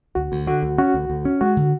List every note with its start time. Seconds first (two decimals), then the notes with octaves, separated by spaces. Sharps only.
0.15 D2 F#4
0.32 D2
0.47 D3 F#4
0.62 D2
0.78 C#4 F#4
0.94 D2
1.10 D2
1.25 C#4
1.41 G#3 F#4
1.57 D3